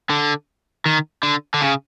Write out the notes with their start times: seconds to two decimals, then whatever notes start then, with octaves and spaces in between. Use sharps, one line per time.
0.10 D3
0.86 D#3
1.23 D3
1.54 D3
1.61 C#3